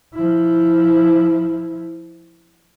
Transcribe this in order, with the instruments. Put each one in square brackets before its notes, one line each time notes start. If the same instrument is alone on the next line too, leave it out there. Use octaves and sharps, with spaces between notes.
[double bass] F3 E4